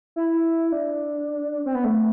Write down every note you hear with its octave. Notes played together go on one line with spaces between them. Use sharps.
E4
D4
C4
B3
A3